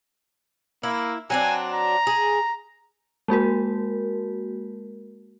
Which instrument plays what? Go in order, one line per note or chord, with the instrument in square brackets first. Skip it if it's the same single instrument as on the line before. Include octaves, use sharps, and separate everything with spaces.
[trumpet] A#3 [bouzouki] E4
[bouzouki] F#3 C4 D4 [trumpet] G#5
[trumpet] A#5
[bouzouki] G#4
[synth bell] G#3 A#3 F#4 A#4